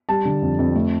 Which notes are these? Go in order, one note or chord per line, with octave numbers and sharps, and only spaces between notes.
G3 A5
D3
F2
F2
A3